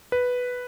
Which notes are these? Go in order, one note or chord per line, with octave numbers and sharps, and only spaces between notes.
B4